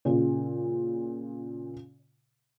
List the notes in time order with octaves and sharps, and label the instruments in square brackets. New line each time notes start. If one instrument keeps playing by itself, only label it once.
[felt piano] A#2 C#3 F4